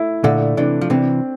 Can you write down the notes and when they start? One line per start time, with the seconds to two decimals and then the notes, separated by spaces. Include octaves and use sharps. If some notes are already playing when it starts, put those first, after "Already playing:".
Already playing: A3 E4
0.24 A#2 D3 A3
0.57 C3 E3 D4
0.81 F3
0.90 C3 E3 C4